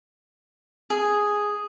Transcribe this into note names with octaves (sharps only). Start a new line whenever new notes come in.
G#4